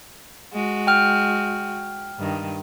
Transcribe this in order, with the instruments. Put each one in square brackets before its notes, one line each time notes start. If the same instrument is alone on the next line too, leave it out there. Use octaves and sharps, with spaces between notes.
[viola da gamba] G#3 F#4
[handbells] G5 F6
[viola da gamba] G2 D#3